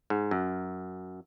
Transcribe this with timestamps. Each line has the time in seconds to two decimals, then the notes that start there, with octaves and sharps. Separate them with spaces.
0.10 G#2
0.31 F#2